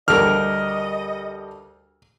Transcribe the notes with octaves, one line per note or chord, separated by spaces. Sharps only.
D2 G3 G4 A4 A#4 D#5 F6